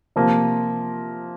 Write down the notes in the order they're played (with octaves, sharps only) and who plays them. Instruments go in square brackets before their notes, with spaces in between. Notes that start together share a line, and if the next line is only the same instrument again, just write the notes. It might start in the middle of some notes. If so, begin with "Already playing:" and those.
[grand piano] C3 F3 A#3 F4